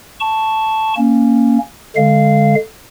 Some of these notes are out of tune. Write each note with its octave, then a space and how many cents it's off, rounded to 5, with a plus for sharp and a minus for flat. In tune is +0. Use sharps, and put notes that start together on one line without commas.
A5 +0 C#6 +0
A#3 +0 C#4 +0
D3 +0 G#3 +0 F5 -15